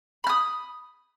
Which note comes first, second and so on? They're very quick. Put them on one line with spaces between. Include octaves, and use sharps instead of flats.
B5 F6 D#6